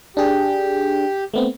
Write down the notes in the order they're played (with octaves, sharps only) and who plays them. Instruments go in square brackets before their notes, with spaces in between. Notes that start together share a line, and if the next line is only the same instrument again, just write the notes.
[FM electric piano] D4 G#4 [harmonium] G4
[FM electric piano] A3 B3 C4